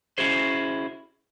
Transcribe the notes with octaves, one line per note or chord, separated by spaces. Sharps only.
C#4 E4 F#4 G#4 C5